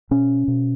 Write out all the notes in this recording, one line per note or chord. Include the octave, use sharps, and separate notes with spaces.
B2 C#4
B2